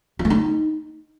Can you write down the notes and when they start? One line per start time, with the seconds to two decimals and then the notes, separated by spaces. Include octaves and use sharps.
0.19 F4
0.25 A3
0.30 D#4